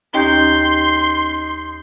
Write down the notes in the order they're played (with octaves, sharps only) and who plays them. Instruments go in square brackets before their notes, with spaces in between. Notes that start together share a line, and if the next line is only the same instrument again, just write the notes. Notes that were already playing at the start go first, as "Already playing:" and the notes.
[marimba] D#2 G4 G5 [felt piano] C#4 D#4 [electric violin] C6 [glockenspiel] G6 G7